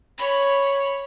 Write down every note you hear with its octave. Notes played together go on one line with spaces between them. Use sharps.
C#5 B5